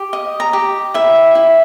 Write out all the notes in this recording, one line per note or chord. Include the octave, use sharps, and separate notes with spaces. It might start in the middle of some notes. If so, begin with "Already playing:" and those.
Already playing: G4
D#5
A#5
G4
E4 E5
E4